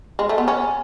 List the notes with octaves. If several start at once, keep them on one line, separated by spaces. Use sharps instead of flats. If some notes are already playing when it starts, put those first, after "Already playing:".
G#3
A3
B3
C#4